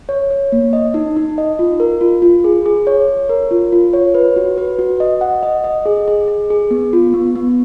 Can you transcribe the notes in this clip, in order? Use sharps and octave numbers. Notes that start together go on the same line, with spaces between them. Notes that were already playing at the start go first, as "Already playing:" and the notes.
C#5
C#5
A#3
D#5
D#4
D#4
D#5
F4
A#4
F4
F4
G#4
G#4
C#5
C#5
A#4
F4
F4
C#5
B4
F#4
B4
F#4
D#5
F#5
D#5
D#5
G#4
G#4
G#4
G#4
B3
F4
B3
B3